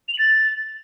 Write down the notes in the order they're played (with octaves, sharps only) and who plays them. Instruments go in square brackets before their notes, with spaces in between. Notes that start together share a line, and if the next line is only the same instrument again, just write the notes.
[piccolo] F7
F#7
A6